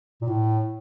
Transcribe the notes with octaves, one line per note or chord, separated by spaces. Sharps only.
A#2
A2